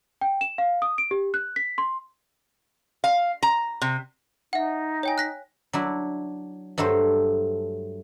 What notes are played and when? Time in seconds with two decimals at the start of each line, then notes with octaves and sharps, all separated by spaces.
0.21 G5
0.41 E7
0.58 F5
0.82 D#6
0.98 D7
1.11 G4
1.34 F#6
1.56 B6
1.78 C6
3.04 F5
3.43 A#5
3.82 C3
4.53 D#4 E5 F#5
5.03 C#5 G5 G#5
5.18 F#6 A#6 B6
5.73 F#3 D4 E4
6.78 G2 F#3 A3 A4 C5